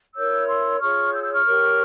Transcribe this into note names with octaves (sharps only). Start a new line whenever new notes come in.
E4 A#4 C#5 E6 G6
C6 E6
F4 G#4 C#5 C#6 F6
E6 G6
E6 G6
C#6 F6
G4 A#4 C#5